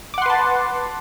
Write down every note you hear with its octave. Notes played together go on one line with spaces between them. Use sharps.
B4 F#5 A5 C6 D6